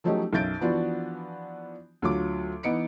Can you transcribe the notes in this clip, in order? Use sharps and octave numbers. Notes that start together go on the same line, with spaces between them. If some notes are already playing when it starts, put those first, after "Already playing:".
F3 F#3 A3 C#4 D#4 G4
B1 F#2 G6 A6 D7
E3 F3 B3 D4 F4 F#4
D2 F#3 F4 D6
E3 B3 D#4 C#7 D7